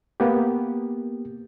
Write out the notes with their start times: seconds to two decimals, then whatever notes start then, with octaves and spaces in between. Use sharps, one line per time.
0.20 A#3 B3 G4